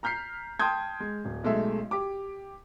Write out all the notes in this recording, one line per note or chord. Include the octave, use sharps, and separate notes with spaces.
A#5 F6 G6 B6 C7
G5 A5 C6 D#6 G6 G#6
G#3
D1
B1 G#3 A3 E5
G4 D6